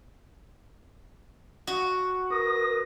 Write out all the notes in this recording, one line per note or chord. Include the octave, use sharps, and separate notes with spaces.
F#4 F#5
A#4 B4 D#6 A#6